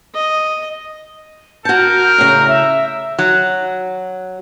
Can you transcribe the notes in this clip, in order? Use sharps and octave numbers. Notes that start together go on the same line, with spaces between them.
D#5
F#4 A#4 A5 G6
A2 C#3 A#5
E5
F#3